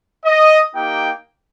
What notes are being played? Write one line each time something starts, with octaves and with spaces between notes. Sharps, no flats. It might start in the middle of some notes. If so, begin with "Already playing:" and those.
D#5
A#3 D#4 G4 G5